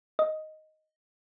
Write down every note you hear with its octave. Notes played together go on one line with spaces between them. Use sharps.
D#5